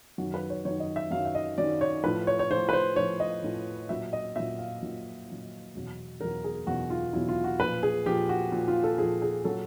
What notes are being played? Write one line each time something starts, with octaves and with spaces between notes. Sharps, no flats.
F#2 D#3 F#3 F#4
B4
C#5
F#2 D#3 F#3 C#5
D#5
E5
F#2 D#3 F#3 F5
E5
D#5
F#2 D#3 F#3 D5
C#5
A2 F3 B4
C#5
C#5
A2 F3 C5
B4
C5
A2 F3 C#5
D#5
A2 F3
A#2 F#3 E5
D#5
A#2 F#3 E5
F5
A#2 F#3
A#2 F#3
E2 B2 F#3
E2 B2 F#3 A#4
G#4
E2 B2 F#3 F#4
F4
E2 B2 F#3 E4
F4
F#4
A#2 F3 B4
G#4
A#2 F3 G4
F#4
A#2 F3
F4
A4
A#2 F3 G#4
G#4
A#2 F#3 A4